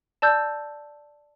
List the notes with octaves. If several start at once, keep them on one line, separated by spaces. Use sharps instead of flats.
D5 A5 E6 G6